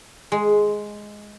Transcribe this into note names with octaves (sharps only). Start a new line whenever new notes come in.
G#3